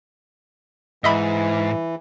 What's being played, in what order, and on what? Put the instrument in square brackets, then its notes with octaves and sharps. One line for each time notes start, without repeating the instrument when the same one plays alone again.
[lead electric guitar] G#2 [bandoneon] E3 [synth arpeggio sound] D#5 E5 B5